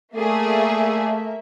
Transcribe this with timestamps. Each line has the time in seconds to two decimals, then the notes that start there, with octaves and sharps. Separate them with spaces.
0.16 A3 A#3 G#4 D5 E5